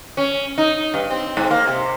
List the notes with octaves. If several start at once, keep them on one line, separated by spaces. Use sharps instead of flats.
C#4
D#4
G2
C4
G#2
A#3
C3